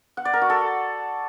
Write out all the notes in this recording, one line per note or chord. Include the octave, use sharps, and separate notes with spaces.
F#5
D5
A#4
F#4
A4